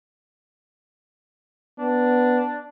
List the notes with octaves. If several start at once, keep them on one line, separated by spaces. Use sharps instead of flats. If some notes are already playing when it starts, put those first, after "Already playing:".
B3 D4